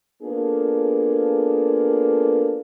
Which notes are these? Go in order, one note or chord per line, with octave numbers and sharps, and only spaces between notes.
A#3 B3 D4 F4 G#4 A4